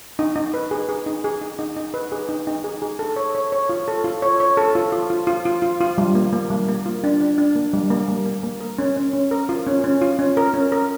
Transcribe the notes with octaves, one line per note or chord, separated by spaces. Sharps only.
D#4
D#4
B4
G#4
G#4
D#4
G#4
D#4
D#4
D#4
B4
G#4
D#4
D#4
G#4
G#4
A4
C#5
C#5
C#5
F4
A4
F4
C#5
C#5
A4
F4
F4
F4
F4
F4
F4
F4
G3
A#3
A#3
G3
A#3
F4
D4
D4
D4
A#3
G3
A#3
G3
A#3
A#3
A#4
C#4
C#4
C#4
A#4
F4
C#4
C#4
F4
C#4
A#4
C#4
A#4